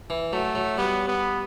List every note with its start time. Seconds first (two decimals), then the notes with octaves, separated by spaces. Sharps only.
0.10 E3
0.33 F#3 A3
0.55 F#3
0.77 G3 B3
1.08 B3